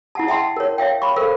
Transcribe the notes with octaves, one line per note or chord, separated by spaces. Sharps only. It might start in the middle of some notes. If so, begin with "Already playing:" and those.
E4 F#5 A5
D#5 E5 F#5 G5 A5 C6
A#4 C#5
C#5 E5 F5 G5
B5 C#6
A4 A#4 C5 F5